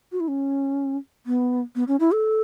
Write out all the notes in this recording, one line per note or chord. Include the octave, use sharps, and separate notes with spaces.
F#4
E4
C#4
B3
B3
C#4
E4
A4